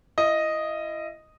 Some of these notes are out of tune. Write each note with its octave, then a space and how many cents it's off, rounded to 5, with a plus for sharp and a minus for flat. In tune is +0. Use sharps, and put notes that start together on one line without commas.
E4 +30 D#5 +0